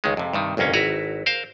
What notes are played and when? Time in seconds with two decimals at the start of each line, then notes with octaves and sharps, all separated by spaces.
0.04 C#2 D#3 G#3
0.17 F2 C3
0.33 G2 C3 D#3
0.57 G1 C2 F2 A#3 C#4
0.74 G#1 E4 F#4 B4 A#5
1.26 A#4 C5 F5